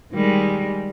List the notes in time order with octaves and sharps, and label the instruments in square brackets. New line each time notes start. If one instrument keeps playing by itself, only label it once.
[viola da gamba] D#3 G3 G#3